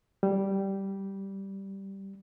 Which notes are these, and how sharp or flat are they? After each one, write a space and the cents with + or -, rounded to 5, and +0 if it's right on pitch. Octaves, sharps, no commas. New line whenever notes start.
G3 -10